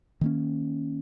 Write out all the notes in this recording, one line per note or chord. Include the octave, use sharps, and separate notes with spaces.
D#3 A#3 C#4